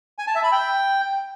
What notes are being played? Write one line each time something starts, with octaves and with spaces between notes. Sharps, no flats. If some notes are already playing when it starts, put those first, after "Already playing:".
G#5
A5
E5
B5
G5